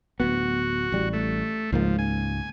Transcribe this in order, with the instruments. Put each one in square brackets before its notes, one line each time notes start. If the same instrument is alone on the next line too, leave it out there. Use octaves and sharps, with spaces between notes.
[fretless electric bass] D1 B3 [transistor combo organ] F#4
[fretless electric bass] A1 G3
[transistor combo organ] A3
[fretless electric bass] C#2 G#2 A#3 [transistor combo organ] F3
[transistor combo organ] G#5